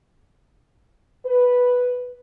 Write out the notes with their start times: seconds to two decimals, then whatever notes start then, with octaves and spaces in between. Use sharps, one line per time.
1.25 B4